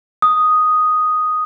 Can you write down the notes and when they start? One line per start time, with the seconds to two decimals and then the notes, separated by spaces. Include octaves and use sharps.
0.22 D#6